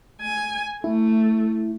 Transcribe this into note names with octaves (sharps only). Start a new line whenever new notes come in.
G#5
A3 E4